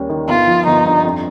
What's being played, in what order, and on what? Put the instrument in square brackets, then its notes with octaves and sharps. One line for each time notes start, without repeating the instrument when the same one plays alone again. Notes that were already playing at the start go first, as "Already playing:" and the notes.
Already playing: [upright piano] D#2 G3 C#4
D#3
[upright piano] G1 [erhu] F4
[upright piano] F3
[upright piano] G1 [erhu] D#4
[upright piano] G2
F2